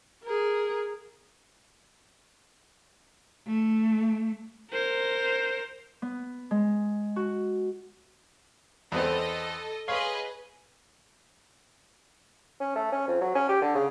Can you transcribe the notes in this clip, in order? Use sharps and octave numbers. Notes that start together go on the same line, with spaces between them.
G#4 A#4
A3
A#4 C5
B3
G#3
F#4
E2 B3 C4 A4 D#5
G#4 B4 C#5 D#5 F5 C6
C#4
A3
C#4
F2
F#3
C#4
G4
D3
C#3